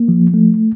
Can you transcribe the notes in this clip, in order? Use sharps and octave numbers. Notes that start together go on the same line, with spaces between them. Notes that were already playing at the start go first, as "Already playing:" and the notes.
Already playing: A#3
F3
A3